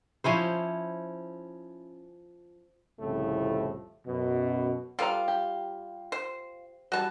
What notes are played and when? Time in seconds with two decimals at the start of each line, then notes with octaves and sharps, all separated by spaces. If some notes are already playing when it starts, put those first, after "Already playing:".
0.24 F3 C#4 E4 C5
3.00 C2 F2 A2 C#3 A3
4.06 F#2 B2
4.99 G3 F4 A4 B4 F5 A#5
5.28 G4
6.12 C5
6.92 E3 G3 F#4 A5